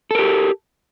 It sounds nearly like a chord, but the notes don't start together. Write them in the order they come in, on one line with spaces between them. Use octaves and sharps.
A4 A#4 G4